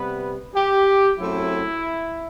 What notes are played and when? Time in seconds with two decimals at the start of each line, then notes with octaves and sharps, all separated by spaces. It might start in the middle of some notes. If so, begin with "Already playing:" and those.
Already playing: C3 G3 B3 B4
0.55 G4
1.18 F#2 F#3 A3 C4 E4